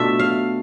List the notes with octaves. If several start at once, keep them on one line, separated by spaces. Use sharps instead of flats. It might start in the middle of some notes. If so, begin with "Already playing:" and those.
Already playing: B2 A3 D4 F4 E5
F5